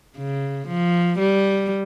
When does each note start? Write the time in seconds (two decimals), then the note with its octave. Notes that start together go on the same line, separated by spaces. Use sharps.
0.17 C#3
0.68 F3
1.19 G3